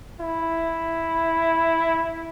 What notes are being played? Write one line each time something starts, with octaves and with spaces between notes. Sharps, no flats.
E4